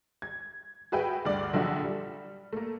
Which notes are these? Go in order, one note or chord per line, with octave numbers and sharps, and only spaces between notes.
G#6
F#4 G#4 B4 E5 G5
D2 G2 D5
A#1 D3 F3 F#3 E5 F#5
G3
A3 A#3